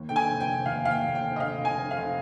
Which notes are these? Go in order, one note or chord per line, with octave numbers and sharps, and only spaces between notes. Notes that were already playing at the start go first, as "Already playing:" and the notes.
Already playing: D#2
D3 G5
G#5
F1
G5
F1
D#2 F5
D#2 F5
G5
D#2
G5
F1
D#5
D3 F5
F1
G#5
D3
F5
F1